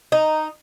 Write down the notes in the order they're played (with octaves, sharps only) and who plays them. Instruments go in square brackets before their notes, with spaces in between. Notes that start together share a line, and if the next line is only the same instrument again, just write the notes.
[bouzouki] D#4